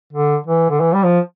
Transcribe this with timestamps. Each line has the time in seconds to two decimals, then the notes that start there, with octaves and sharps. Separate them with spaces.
0.12 D3
0.46 E3
0.70 D3
0.80 E3
0.93 G3
1.04 F3